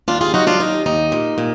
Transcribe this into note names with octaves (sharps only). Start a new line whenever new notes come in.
D#2 D4 F4
F4 G#4
F#3 D#4 F#4
D4 F4
D#2 D#4
D#2 D#4
A#2
A#2